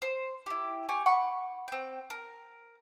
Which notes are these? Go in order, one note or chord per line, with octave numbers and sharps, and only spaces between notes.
C5
E4 G4
G4 G#5 C#6
F#5 B5 C#6
C4 G5
A#4